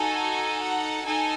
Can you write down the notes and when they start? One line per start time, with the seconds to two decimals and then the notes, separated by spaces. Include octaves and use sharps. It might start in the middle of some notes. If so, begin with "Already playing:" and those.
Already playing: D#4 F#4 A4 G#5
0.63 F#5
1.05 D#4 A4 G#5